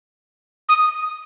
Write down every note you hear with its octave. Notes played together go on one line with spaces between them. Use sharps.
D#6